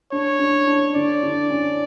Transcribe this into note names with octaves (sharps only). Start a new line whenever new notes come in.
D4 C#5
D4
D4
D3 D5
D3
C#4